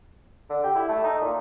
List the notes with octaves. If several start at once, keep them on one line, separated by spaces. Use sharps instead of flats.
D3
G4
E4
A3
D#4
A#2